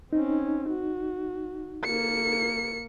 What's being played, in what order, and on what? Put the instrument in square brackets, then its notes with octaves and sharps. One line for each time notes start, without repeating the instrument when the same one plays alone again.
[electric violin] C4 C#4 [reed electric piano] D#4
[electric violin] F#4
A#3 C#7